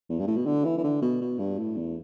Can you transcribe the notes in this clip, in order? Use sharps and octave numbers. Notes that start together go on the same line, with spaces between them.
E2
G2
A2
B2
D3
E3
E3
D3
B2
B2
G2
A2
E2